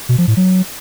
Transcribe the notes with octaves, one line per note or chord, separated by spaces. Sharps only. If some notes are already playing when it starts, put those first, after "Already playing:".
B2
F3
A2
F#3